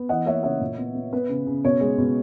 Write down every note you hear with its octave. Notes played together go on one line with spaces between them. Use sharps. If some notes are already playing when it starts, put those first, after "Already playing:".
Already playing: B3
E3 D#5 F#5
A#3 C#5 E5
C#3 C#5 E5
A#2
B3
B3
B3 B4
C#3
C#3
B2 C#5
G#3
B2